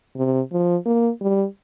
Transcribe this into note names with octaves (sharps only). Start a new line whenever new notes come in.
C3
F3
A#3
G3